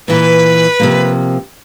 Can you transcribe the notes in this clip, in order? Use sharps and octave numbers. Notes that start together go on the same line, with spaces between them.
A#2 E3 B4
C3 F3 A#3